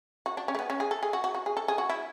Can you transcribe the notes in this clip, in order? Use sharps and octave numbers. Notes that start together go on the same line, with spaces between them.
F#4
D4
C#4
A3
B3
C#4
G#4
A4
G#4
F#4
F#4
F#4
G#4
A4
G#4
F#4
E4